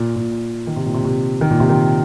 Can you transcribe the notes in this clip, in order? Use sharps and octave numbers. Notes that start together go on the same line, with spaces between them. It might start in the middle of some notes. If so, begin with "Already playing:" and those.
Already playing: A#2
A#2
D#3
C3
A#2
C3
C3
D#3
A#2
C3
D#3